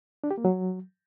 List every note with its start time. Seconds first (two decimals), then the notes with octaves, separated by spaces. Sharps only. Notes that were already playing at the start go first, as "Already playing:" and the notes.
0.24 D4
0.31 G4
0.38 A#3
0.45 F#3